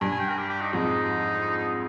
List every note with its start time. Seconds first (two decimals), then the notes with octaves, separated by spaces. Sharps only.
0.01 G2 G#5
0.11 G#5
0.20 G5
0.29 A#4
0.38 G4
0.49 G4
0.62 D#4
0.73 F2 G#2 D#4